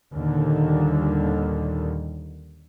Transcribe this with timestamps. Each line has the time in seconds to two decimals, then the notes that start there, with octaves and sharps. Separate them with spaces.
0.11 D#2 A#2 D3 D#3 G3